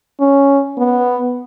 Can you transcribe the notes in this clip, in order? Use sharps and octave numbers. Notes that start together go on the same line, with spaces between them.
C#4
B3